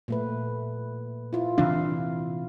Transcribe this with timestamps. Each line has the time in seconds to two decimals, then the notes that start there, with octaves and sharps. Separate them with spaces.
0.08 A#2 A3 B4
1.33 E4 F4
1.58 C3 E3 D4 F5